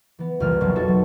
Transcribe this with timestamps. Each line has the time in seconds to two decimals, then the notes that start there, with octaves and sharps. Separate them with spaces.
0.19 E3 B3
0.40 C2 F2 A#2 E3 F6
0.60 F#1 B1 F2 B2 F#3
0.76 D#4 F#4 A4 C#6
0.88 F#3